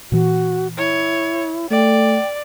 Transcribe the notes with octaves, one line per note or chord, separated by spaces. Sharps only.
A#2 E3 F#4
E4 C#5
A3 D5 G5